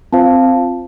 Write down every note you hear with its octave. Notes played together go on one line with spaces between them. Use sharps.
C4 F4 C5 F5 A5